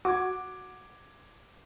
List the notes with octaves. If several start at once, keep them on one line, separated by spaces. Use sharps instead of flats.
F#4 D6 G#6